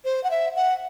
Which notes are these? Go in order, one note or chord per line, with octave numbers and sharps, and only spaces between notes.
C5
F#5
E5
F#5